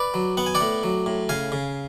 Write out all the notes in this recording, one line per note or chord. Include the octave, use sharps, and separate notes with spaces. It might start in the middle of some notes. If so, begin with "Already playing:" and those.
Already playing: B4 D5
F#3
B3 F#5
G#5
D5 F#5
A2
F#3
A2
C#3 F5 G#5
C#3